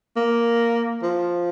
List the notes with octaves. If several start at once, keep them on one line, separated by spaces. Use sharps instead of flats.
A#3
F3